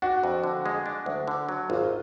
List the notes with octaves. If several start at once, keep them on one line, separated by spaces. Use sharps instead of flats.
D4 F#4
F2
D3
G#3
D4
D2
D3
F#3
G#1 F4